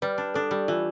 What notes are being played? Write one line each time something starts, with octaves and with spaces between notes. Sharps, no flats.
G3 B4
D4
D4 A4
G3 G4
E3 F4